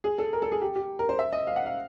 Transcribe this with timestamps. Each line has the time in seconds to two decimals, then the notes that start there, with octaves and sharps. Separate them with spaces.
0.04 G#4
0.18 A4
0.33 A#4
0.42 A4
0.52 G#4
0.62 G4
0.76 G4
0.99 A#4
1.09 C5
1.19 E5
1.33 D#5
1.47 F5
1.56 F#5
1.66 F5